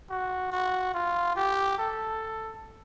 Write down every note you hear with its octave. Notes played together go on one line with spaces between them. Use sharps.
F#4
F#4
F4
G4
A4